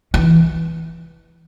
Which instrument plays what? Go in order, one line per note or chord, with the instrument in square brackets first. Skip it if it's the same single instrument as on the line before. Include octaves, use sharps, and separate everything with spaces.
[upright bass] E3